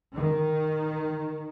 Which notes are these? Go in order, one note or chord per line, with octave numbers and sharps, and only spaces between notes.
D#3